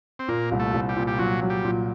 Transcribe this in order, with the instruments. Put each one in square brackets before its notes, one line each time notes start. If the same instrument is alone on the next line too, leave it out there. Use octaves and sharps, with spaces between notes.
[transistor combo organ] C4
[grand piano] A#2 [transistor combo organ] A#3
[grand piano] C2
[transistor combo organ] A3
[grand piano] C2
[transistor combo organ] G3
[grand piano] A#2
[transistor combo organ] G3
[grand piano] A#2 [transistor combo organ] F#3
[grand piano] F#3
[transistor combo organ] G3
[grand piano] A#2